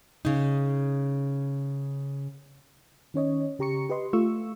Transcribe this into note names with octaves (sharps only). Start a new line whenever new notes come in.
C#3 D#4
D#3 C#4 C#5 D#5
C#3 G4 A#5 C#6 C#7
G4 B4 D#5 C6
A3 F4 C#6 E6